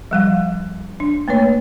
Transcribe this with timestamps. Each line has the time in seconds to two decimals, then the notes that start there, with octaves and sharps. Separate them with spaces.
0.11 F3 G3 F5
0.27 F3
1.00 D4
1.28 A3 A#3 B4 C#5